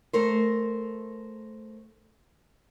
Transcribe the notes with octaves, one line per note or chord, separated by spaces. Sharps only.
A3 A#4 C5